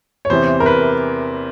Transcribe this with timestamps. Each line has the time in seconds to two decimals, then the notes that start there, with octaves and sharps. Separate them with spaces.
0.25 C#5
0.30 E2 C3 E3 C5
0.60 A#4
0.66 B4